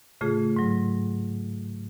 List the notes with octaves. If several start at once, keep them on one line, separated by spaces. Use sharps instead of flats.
A2 C#3 A3 F4 G#4
G#2 F#3